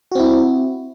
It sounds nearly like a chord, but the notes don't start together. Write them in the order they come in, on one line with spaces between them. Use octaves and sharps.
F#4 C4 E4